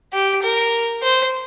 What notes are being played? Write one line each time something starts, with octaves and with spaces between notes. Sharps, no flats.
G4
A#4
C5